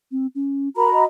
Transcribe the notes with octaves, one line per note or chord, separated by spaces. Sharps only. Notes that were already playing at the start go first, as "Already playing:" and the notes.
C4
C#4
F#4 A#4 A#5 B5
D#5